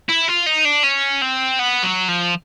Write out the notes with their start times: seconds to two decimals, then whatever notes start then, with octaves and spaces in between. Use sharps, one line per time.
0.09 E4
0.28 F4
0.46 D#4
0.65 D4
0.84 C#4
1.22 C4
1.59 B3
1.83 F#3
2.09 F3